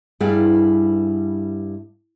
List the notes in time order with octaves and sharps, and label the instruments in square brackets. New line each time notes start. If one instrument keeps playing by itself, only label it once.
[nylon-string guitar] G2 G3 B3 E4 G#4 F5